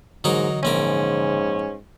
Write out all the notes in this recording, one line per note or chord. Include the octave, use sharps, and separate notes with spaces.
G#2 D3 E3 F#3 D#4 A#4
A#1 G#2 C4 C#4 A#4